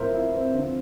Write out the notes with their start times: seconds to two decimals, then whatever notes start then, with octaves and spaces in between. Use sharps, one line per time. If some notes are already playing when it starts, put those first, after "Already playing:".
Already playing: A2 F3 A#4 C5 E5
0.14 E4
0.33 C4
0.54 D3 F3 C4